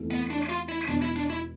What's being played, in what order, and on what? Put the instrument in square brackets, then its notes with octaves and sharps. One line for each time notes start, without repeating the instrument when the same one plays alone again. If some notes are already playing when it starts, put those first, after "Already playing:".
Already playing: [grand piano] E2 C3 E3 A3 E4
[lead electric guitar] B3
D4
F4
E4
[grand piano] E1 E2 B2 [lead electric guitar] D4
[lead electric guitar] E4
D4
E4